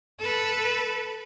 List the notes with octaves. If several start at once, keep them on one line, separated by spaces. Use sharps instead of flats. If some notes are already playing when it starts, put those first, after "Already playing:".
A4 B4